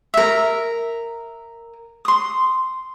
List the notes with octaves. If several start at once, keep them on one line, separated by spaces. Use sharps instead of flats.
A#4 E5
C6 D#6